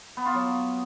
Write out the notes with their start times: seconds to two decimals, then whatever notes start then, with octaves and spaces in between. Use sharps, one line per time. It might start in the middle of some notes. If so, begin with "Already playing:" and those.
0.17 B3
0.25 F4
0.34 F#3